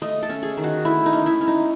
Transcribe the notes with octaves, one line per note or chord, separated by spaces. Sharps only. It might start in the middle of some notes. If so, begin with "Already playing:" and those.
A3 D#5
A4
C#4
G#4
D#3
F#4
A3 E4
D#4
C#4
E4
C#4
D#4